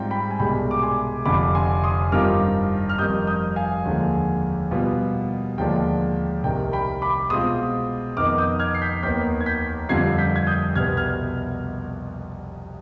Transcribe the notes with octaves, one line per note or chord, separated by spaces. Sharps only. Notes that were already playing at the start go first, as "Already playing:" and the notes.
Already playing: G#2 G3 C4 F4 G5
G5 B5
G#5
C2 B2 G#3 D4 G5 B5
D6
G#5 C6
F1 F2 D3 F3 B5 D6
G#5 C6
C6 D#6
G2 D#3 G3 C4 F4 D6 F6
F6
F2 D#3 G3 D#6 G6
D#6 G6
F5 G#5
D#2 D3 F3 G#3
B2 G3 B3 F4
D#2 D3 F3 G#3 D4 G5
C2 C3 D#3 G5
G5 B5
B5 D6
B2 G#3 C4 F4 C6 D#6
F2 D#3 B3 D#4 D6 F6
D#6 G6
F6 G#6
C7
G6 B6
D#2 D#3 B3 G6 B6
G#6
G6 B6
F2 D3 G3 C4 F4 G#6 C7
G6 B6
G#6
D#6 G6
C2 B2 B3 F6 G#6
F6 G#6